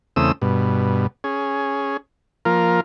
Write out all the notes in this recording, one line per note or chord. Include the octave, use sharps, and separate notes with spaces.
E2 C#3 A3 C4 D#6 E6
G2 B2
C#4 G#4
F3 A#3 F4 A#4